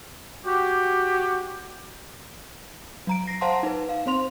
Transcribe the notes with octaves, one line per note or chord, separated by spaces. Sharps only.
F#4 G4
F#3 A#5 D7
A#6 C7
C5 F5 F#5 A5 A#5 C6
D#4 B4
F5
C4 C5 C6 F7